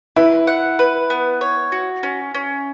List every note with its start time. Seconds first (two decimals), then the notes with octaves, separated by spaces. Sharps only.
0.16 E4 B4
0.47 F#5
0.79 B4
1.10 B3
1.41 C#5
1.72 F#4
2.03 C#4
2.35 C#4